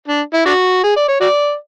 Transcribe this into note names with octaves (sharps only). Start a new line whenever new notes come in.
D4
E4
D4 F#4
G#4
D5
C#5
F#4 D5